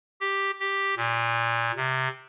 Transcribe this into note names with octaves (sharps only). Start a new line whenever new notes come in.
G4
G4
A#2
C3